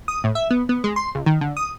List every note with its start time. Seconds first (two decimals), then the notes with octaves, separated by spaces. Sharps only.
0.08 D#6
0.24 A2
0.35 E5
0.50 B3
0.69 B3
0.84 G#3
0.96 C6
1.15 C#2
1.26 D#3
1.41 D3
1.57 D#6